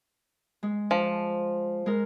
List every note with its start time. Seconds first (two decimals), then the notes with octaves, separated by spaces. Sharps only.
0.63 G#3
0.91 F3
1.86 G#3 A#4